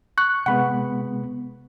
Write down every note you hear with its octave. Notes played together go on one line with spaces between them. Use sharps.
C#6 F#6
C3 G#3 B3 F#5 B5